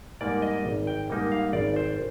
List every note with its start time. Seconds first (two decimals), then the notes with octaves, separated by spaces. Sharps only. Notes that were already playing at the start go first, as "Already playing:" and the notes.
0.21 G#2 G3 A#3 D#4 D5
0.42 D#5
0.65 G#1
0.87 G5
1.10 G#2 G3 A#3 D#4
1.32 F5
1.53 G#1 D5
1.76 C5